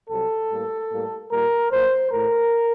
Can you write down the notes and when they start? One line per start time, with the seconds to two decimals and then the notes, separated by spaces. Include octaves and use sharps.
0.10 C2 C3 F#3 A4
0.50 A2 G3 A#3
0.91 A2 G3 A#3
1.31 A#2 G3 A#3 A#4
1.71 A#2 F#3 A#3 C5
2.11 A2 A3 A#4